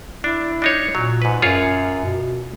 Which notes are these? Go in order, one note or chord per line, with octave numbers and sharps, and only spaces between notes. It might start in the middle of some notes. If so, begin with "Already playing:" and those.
D4 E4
D4 D#4 C#5
A#2 F#3
G#2 B4
F#2 F4 G#4 C#5
B2